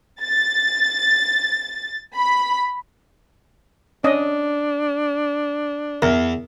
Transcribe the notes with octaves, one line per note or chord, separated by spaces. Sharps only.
A6
B5
C#4 D4 D#5
E2 A#4